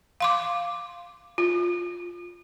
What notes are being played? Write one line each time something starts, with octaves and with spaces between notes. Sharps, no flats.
F5 C6 D6
F4